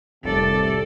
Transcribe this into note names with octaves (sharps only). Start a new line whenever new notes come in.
F1 C2 A2 C3 A4 D5